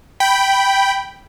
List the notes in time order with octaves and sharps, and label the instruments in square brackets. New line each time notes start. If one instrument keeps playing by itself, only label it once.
[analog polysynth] G5 B5